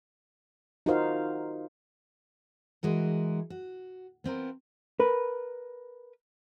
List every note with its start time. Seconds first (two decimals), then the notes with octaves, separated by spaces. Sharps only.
0.86 D#4 F4 F#4 A#4 C5 F5
2.83 E3 G#3 F#4 A#4
3.50 F#4
4.24 B3 C4 F4 A#4
5.00 A#4 B4